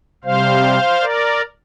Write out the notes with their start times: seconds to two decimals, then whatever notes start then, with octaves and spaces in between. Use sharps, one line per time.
0.24 C3 G3 C5 F5
1.01 A#4 D5